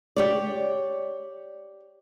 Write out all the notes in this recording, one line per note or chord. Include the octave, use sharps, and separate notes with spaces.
G4 C#5 D5